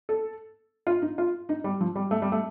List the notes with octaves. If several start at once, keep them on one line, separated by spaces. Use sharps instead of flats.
A4
F4
D#4
F4
D#4
G3
F3
G3
A3
G3
A3